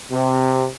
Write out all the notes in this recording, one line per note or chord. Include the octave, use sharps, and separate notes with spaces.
C3